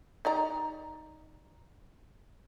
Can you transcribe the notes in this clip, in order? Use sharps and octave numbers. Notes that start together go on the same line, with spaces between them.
D#4 D5 A#5